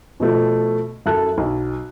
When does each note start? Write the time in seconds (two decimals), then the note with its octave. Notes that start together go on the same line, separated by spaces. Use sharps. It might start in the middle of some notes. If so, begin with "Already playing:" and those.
0.20 B2 F3 A3
1.06 F#2 E4 A4 A5 F#6
1.38 B1